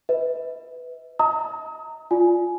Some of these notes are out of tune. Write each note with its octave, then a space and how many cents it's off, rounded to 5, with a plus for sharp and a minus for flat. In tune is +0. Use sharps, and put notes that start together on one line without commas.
B4 +10 E5 -40
D#5 +35 A#5 -20 D#6 +35
F4 +0 D5 +0 G#5 +15